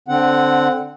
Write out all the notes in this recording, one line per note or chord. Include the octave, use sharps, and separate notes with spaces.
D3 C4 F#5